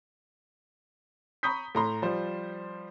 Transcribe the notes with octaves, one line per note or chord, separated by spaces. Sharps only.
A#5 B5 C#6 D#6 G6 B6
A2 A#5 C6
F3 G3 C5